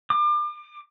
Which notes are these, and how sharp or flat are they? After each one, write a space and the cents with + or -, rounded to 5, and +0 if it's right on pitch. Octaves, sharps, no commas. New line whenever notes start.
D6 +35